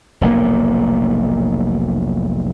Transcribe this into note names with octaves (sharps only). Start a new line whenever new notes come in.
F1 B1 A2 A#3